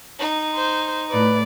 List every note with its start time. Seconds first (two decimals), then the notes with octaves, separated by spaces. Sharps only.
0.19 D#4
0.54 C5
1.11 A2 B4 D5